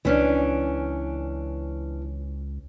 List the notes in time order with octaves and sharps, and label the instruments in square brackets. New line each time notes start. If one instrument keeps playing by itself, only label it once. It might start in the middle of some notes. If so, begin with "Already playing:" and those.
[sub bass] C#2 [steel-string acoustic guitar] E3 C#4 D4